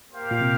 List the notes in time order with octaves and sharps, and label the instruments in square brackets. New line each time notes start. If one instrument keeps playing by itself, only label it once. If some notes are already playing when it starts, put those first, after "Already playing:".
[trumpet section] A#3 G4 C5 F5
[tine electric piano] A#2
C3